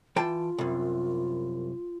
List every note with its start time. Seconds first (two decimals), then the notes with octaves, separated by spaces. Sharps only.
0.16 E3 F4 G5 A5
0.59 C2 F#2